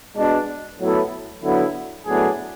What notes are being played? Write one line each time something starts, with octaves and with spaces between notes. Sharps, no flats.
B2 G#3 D4
A2 F#3 B3 E4 A4
D3 F#3 B3 E4
A2 F#3 B3 D4 G#4